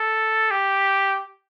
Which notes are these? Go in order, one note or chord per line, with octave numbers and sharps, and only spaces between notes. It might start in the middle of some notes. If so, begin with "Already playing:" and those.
Already playing: A4
G4